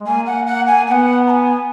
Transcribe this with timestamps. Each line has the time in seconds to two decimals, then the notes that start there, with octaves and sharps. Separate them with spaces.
0.01 G#3
0.06 A#3 G#5
0.27 F#5
0.47 F#5
0.67 G#5
0.86 B3 G#5
0.91 F#5
1.27 A#5
1.30 G#5